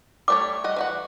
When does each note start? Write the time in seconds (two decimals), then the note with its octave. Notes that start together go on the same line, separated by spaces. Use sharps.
0.28 G3 A3 C#5 D6
0.64 G3 D#5 F#5
0.76 E3 F#4 F#5